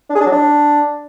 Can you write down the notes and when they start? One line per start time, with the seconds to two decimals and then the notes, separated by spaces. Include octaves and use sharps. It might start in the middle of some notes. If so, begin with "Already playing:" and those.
0.10 D4
0.15 G#4
0.21 D4
0.27 F#3
0.32 D4